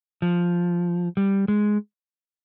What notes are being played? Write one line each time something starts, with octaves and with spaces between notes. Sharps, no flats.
F3
G3
G#3